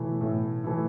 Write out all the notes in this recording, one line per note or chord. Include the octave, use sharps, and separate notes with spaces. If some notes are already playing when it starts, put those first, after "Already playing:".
Already playing: B2 E3 A3 E4
A2
E3 A3 E4